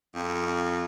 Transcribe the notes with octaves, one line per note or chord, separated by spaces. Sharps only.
F2